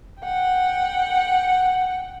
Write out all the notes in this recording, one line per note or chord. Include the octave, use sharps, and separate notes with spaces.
F#5 G5